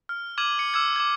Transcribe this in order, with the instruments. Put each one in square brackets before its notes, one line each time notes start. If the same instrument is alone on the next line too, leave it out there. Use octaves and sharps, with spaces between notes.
[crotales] F6
D6 F6 G#6 D#7 F#7
C#7
D6 E6 F6 G#6
D6 G#6